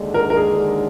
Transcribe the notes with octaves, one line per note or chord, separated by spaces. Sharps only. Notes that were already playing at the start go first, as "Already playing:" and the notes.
Already playing: D#2 D3 G#3
A#4
A#4
G#4